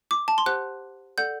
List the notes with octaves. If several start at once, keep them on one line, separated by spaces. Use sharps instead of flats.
D6
A5
C6
G4 C5 F#5 F#6
A4 D5 F#5 G6